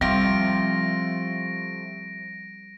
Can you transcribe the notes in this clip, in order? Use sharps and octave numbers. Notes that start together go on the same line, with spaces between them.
C3 F3 G3 A3 C4 F4 A#6 D7